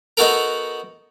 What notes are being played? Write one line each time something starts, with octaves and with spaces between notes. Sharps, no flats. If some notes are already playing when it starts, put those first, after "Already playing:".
B3 D#4 F#4 A4 A#4